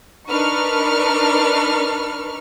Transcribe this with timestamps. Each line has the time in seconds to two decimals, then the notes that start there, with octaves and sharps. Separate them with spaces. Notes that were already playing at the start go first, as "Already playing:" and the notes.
0.29 D4 D#4 A#4 B4 C#6 F6